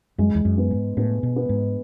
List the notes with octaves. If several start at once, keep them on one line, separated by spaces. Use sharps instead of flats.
F#2 G#3
E2
F#2
B3
G#2
A2 B3
B2
B3
G#2